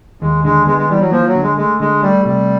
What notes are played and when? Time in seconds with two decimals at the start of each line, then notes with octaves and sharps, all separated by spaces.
0.21 D#2 G#3
0.44 D3 G#3
0.67 G#3 B3
0.78 G#3
0.89 E3 G3
1.01 F#3
1.11 F3 A#3
1.27 F#3
1.35 D3
1.42 G#3
1.57 G#3 A3
1.79 D3 G#3
2.02 G3 A3
2.25 C3 G3